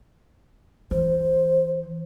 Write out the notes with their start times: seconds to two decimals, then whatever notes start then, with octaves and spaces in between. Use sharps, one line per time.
0.91 E3 C5